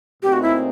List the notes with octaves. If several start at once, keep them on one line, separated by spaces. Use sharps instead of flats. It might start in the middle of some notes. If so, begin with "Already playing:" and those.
A#2 F#3 A3 C4 D#4 G4
F#4
E4